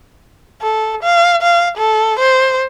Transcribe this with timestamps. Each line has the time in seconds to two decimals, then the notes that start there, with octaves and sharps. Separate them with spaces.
0.62 A4
1.03 F5
1.43 F5
1.78 A4
2.20 C5